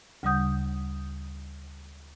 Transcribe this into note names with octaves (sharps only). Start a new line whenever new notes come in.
D2 C#3 G3 F#5 D#6 G6